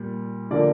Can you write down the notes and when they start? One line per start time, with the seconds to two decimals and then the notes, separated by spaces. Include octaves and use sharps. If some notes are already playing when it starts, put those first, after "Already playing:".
Already playing: A#2 G3
0.51 D3 F3 A#3 D5